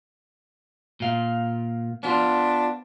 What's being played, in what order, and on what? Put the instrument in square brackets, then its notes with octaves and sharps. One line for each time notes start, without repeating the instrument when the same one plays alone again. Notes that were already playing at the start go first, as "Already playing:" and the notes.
[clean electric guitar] A#2 F5
[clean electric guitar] B3 F4 C5 [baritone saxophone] D4